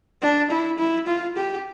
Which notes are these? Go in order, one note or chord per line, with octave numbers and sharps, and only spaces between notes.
D4
E4
E4
F4
G4